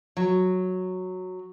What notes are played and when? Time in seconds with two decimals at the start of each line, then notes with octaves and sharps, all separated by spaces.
0.17 F#3